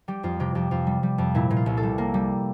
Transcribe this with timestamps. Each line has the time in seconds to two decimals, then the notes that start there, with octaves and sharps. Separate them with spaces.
0.08 G3 G4
0.23 F2 F4
0.40 C3 G4
0.55 F2 G4
0.71 F2 F4
0.87 G3
1.03 G3
1.18 F2
1.35 A#2 E4
1.51 A#2
1.56 F4
1.66 C2
1.77 A4
1.83 G3
1.98 A#3
2.14 G3